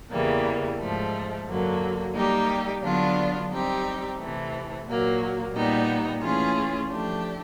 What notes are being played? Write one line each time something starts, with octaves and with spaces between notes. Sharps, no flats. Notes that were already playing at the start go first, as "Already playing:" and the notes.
E2 C#3 E3 G3 A#3
G#2 F3 A3
F#2 D3 F#3 A#3
G3 A#3 D#4 G4
D3 F#3 B3 D4 F4
G3 C4 D#4 G4
C3 E3 A3
A#2 F#3 A#3
A#2 G3 B3 D#4
E3 A3 C#4 F4 G#4
F3 A3 D4 G4